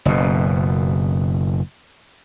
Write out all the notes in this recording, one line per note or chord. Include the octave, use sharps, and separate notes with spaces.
F#1 B2